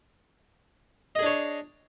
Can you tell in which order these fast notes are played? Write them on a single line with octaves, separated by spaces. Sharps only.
D#5 G#4 D4 C#5